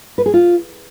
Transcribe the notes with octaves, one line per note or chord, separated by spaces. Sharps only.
B4
G#4
F4